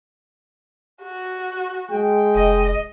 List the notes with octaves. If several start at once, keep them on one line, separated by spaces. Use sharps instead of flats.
F#4
G#3 G5
F1 D#5